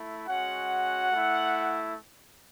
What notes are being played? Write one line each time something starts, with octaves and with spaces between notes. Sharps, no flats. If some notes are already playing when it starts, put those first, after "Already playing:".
Already playing: A3 E4
G#3 C#4 F#4 F#5
A3 E4